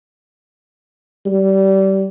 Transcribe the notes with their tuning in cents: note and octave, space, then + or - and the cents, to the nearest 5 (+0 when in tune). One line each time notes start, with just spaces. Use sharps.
G3 -25